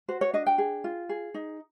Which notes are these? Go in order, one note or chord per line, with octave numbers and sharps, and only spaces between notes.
F#4 C5
C#5
D4 D#5
G5
G#4
F4
G#4
D#4